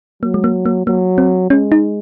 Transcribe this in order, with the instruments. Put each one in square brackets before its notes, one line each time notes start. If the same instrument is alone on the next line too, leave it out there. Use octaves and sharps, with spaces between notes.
[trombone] F#3 [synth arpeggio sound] A#3
[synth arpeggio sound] G#3
A#3
A#3
[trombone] F#3 [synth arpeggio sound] A#3
[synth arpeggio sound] C4
[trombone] G#3 [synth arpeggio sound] C#4
[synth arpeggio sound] D#4